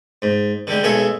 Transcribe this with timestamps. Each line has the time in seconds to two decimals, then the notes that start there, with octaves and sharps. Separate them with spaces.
0.22 G#2
0.67 D3 G3 G#3
0.83 B1 G#3 G#4 A4 C#5 E5